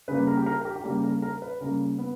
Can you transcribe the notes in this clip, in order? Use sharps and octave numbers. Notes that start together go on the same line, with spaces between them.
C#3 G3 A#3 B4
A#4
G4
A#4
A#4
G4
G4
C#3 G3 A#3 A#4
A#4
A#4
B4
C#3 G3 A#3 A#4
B3